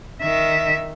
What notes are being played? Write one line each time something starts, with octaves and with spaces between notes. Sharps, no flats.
D#3 E5